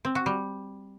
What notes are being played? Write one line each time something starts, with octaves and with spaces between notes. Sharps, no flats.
C4
F#4
G3